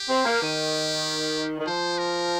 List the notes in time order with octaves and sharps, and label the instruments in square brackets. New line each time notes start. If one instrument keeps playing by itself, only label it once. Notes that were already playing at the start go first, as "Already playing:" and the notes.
Already playing: [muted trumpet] G4
[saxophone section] C4
A#3
D#3
D#3
[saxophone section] F3 [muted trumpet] C5
[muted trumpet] A#4